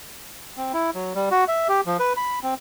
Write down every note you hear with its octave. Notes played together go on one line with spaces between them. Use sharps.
C4
E4
F#3
G3
F#4
E5
G4
F3
B4
B5
C4